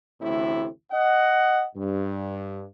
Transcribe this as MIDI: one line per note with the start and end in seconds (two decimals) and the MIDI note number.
0.22 0.68 33
0.22 0.68 38
0.22 0.68 45
0.22 0.68 48
0.22 0.68 64
0.92 1.66 75
0.92 1.66 78
1.76 2.64 43